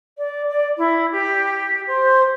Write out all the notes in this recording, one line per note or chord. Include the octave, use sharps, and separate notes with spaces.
D5
D5
E4
G4
C5